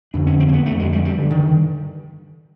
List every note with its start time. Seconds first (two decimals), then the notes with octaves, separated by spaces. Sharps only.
0.14 F2 D3 D4
0.26 C#4
0.40 C4
0.49 A#3
0.53 B3
0.66 F2 D3 A3
0.79 G#3
0.92 G3
1.05 G3
1.18 G2 D3
1.30 D#3